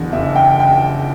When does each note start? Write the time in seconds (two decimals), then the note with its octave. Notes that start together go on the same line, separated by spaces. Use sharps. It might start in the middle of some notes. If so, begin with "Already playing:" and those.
Already playing: F#1 E2 D3
0.13 F#1 E5
0.36 G5
0.60 G5